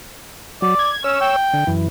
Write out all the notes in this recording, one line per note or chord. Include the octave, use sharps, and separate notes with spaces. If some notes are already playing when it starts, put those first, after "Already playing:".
F#3 D5
G#6
C#4 C#5 E6
G5
D3
F#2 E3